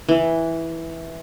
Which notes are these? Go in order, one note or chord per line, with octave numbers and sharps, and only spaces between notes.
E3